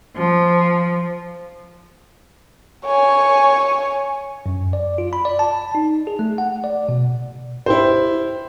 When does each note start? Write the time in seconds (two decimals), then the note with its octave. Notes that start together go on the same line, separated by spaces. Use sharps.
0.16 F3
2.85 C#5 G#5
4.46 F#2
4.73 D5
4.98 F4
5.13 B5
5.25 D5
5.39 A5
5.75 D#4
6.07 G#4
6.19 A3
6.38 F#5
6.64 D5
6.89 B2
7.66 E4 G4 C5